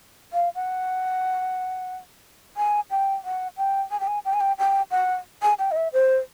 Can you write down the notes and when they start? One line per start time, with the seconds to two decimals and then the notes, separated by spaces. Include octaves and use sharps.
0.33 F5
0.55 F#5
2.57 G#5
2.91 G5
3.25 F#5
3.57 G5
3.91 G#5
4.00 G5
4.07 G#5
4.25 G5
4.34 G#5
4.41 G5
4.59 G5
4.91 F#5
5.42 G#5
5.59 G5
5.71 D#5
5.76 E5
5.93 C5